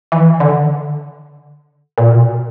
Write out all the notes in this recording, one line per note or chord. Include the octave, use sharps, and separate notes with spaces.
E3
D3
A#2
B2